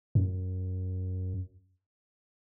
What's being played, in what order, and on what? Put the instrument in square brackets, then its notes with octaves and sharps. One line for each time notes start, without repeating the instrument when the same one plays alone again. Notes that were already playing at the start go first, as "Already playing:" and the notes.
[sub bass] F#2